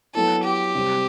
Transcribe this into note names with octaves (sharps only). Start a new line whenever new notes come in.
F#3 B3 E4 A4
G4
C3 G3 C4